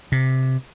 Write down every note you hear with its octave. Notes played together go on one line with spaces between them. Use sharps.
C3